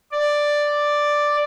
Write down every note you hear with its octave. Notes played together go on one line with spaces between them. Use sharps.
D5